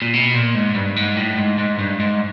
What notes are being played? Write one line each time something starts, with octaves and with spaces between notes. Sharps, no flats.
A#2
B2
A#2
G#2
G2
G#2
A2
G#2
G#2
G2
G#2